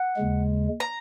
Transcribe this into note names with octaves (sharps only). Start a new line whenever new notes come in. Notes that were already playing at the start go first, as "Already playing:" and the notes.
Already playing: F#5
D#2 C#3 G#3
A#5